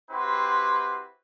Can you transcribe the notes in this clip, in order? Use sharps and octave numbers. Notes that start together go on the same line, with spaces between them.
C4 E4 F#4 G4 B4 C6